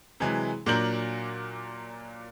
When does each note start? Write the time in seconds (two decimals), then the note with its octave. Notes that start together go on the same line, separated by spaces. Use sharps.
0.20 C3 E3 F#3 G#3
0.66 A#2 F#3 D4 A#4 G6 F#7